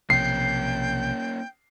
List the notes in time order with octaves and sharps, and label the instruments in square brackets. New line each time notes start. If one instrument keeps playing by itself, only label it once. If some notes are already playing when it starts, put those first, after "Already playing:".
[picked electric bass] B1 C3 F3 [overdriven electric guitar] A#3 C#4 [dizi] G5 [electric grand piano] C7